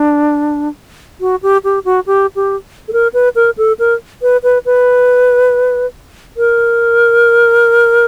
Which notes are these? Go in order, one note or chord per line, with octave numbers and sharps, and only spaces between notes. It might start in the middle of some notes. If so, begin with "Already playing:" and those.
Already playing: D4
F#4
G4
G4
F#4
G4
G4
A4
A#4
B4
A#4
A4
A#4
B4
B4
B4
A#4